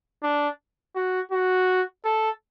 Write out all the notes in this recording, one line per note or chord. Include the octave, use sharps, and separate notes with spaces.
D4
F#4
F#4
A4